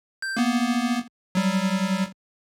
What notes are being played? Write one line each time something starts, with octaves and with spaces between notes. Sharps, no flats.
G6
A#3 B3
F#3 G3